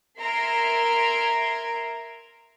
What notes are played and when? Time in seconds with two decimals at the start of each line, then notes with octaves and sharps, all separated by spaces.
0.20 A#4 E5 A#5 C6 G#6 D7